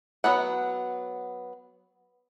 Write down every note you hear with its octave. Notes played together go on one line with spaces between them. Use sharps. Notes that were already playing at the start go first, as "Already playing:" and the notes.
F#3 B3 F#5